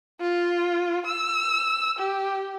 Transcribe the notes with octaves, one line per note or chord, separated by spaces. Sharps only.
F4
E6
G4